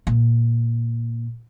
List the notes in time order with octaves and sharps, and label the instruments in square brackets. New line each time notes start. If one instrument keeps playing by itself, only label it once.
[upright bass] A#2